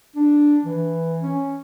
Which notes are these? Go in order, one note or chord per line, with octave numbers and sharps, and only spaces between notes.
D4
E3
C#4